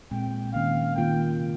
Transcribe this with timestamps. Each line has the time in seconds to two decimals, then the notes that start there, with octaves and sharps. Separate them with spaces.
0.11 A#2 G#3 C4 G5
0.53 D#3 A#3 C#4 F5
0.95 D#3 A#3 F4 A#4 G5
1.39 C3 D#3